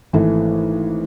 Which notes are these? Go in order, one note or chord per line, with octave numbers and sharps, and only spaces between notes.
G#1 E3 A3